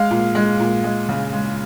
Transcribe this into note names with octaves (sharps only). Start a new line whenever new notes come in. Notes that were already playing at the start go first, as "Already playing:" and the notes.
Already playing: G#3 F5
A#2
G#3
A#2
G#3
C#3
G#3